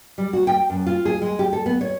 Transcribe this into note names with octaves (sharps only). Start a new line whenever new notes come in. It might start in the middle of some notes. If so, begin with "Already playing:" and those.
G3
F#4
G5
F#2
F4
G#4
G#3
G4
A4
B3
C#5